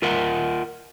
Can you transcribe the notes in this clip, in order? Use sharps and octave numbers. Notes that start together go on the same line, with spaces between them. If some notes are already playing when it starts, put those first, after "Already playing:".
F4 A#4 E5 F#5